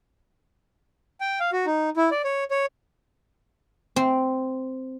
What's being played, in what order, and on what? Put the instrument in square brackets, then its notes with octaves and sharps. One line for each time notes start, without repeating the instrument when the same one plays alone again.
[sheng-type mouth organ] G5
F5
F#4
D#4
E4
D5
C#5
C#5
[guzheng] C4